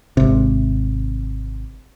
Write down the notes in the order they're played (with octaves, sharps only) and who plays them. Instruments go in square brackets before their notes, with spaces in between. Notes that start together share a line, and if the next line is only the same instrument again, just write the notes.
[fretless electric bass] G#1 C3